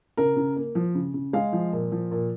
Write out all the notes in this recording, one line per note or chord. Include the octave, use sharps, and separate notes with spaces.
C#3 A#4
C#3
A#3
F3
C#3
C#3
G#3 F5
F3
A#2
F3
A#2